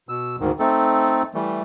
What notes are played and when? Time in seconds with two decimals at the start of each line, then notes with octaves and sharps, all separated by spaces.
0.09 B2 E6
0.40 D2 G#2 D#3
0.59 A3 C4 D#4 A4
1.34 E3 G3 A3